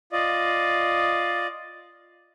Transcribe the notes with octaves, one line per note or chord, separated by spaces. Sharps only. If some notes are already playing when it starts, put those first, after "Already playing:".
F4 D5 D#5